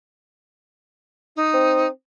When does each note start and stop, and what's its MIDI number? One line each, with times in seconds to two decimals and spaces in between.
1.36 1.86 63
1.54 1.87 60